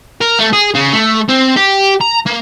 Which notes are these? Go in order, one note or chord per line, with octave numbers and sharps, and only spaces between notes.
A#4
A3
G#4
C#3
A3
C4
G4
A#5
A#3